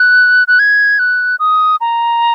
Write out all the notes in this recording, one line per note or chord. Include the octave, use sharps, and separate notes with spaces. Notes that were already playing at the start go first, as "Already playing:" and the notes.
Already playing: F#6
F#6
G#6
F#6
D#6
A#5